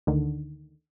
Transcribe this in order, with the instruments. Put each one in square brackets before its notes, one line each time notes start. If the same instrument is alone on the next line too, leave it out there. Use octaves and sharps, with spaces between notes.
[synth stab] D2 D3 D#3